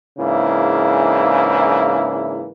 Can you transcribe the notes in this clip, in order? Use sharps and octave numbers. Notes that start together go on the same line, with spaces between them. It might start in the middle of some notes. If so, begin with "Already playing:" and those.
G#2 C#3 E3 A#3 D4 E4